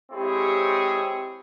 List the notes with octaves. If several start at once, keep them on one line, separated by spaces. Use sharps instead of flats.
G#3 C4 E4 G4 G#4 C#5